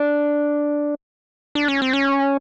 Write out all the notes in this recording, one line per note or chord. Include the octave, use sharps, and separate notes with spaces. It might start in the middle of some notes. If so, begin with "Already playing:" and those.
Already playing: D4
D4
C#4
C4
C#4